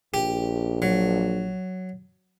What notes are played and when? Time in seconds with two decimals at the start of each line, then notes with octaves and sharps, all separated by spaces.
0.14 A#1 G4
0.82 F#3